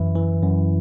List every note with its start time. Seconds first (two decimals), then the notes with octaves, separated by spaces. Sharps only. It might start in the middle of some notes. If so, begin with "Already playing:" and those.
Already playing: F#2 E3 E4
0.15 E3
0.43 F#2